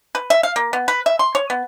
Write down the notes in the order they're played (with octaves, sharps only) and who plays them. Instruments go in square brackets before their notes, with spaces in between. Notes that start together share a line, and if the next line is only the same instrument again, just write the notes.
[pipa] B4
E5
F5
A#3
B3
B4
E5
C6
C#5
B3